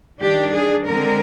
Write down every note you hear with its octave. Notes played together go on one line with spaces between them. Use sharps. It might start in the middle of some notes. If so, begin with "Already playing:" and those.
D#3 G3 D4 G4
G#4
D3 G#3 C4 A#4